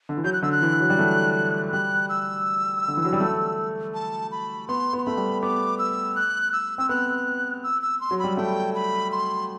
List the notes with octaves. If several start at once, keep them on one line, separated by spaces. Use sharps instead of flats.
D3
E3
F#3 G6
F#6
D3 E6
F#6
E3
F#3
G3
A3
G3 F#6
E6
D3
E3
F#3
G3
A3
A5
B5
B3 C6
B3
C6
A3 B5
G3
B3 D6
E6
F#6
E6
C4 E6
B3 F#6
E6
E6
C6
F#3
G3 B5
A3 G5
B5
C6